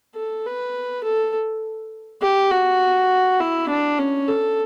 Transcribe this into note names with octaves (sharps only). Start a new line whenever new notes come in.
A4
B4
A4
G4
F#4
E4
D4
C#4
A4